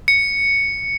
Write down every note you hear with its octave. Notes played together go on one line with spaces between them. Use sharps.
C#7